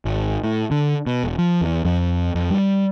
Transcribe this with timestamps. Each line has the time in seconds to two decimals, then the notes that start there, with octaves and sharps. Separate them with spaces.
0.05 G#1
0.44 A2
0.71 D3
1.07 B2
1.24 E1
1.38 F3
1.61 E2
1.85 F2
2.35 F2
2.50 G3